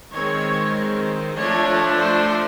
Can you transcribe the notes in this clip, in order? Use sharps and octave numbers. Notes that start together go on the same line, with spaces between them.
D#3 G#3 C4 C#5
F3 A3 D4 C#5
C5